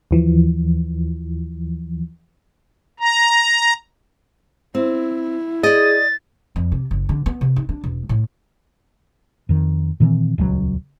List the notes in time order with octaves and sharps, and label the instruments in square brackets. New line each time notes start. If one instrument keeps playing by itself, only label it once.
[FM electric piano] D#2 E3 F3
[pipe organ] A#5
[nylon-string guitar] C4 [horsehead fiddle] E4
[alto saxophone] G#4 [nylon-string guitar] D5 D#5 [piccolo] A6
[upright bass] F2
C3
F#1
D3
B3
C3
D#4
D4
E1
A2
[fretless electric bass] F2 D#3
A#2 D#3 E3 C4
D#1 C#2 C#3 F#3